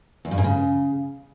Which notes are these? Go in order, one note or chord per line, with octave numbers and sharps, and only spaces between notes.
E2
G2
G#2
C#3